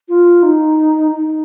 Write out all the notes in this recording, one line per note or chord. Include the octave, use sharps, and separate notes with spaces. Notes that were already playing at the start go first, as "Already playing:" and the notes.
F4
D#4
D#4